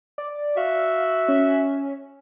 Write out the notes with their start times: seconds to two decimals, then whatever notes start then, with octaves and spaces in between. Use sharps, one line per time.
0.18 D5
0.57 F#4 E5 F5
1.28 C#4